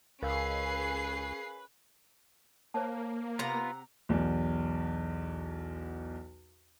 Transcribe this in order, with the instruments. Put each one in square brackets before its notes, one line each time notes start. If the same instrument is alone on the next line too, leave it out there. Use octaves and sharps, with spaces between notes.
[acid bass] C#2 [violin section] C#4 G#4 C7 [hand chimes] A#4 F5 E6 [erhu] B4
[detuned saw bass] A#3 [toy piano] C5 C#5 A5
[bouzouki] C3 F#5 A#5 [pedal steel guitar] B3 F4
[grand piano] B1 E2